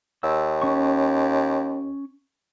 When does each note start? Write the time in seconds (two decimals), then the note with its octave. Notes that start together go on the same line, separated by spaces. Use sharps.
0.23 D#2 E6
0.62 C#4 C#6